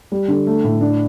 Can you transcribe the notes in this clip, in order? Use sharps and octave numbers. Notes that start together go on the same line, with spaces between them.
G3
D3
A3
A2
D4